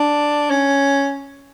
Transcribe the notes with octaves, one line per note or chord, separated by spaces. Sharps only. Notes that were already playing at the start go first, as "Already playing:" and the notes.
Already playing: D4
C#4